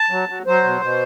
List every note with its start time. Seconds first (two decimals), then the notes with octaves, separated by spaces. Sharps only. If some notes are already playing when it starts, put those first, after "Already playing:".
Already playing: A5
0.10 F#3
0.29 F#3
0.46 F#3 C5
0.64 B2
0.82 B2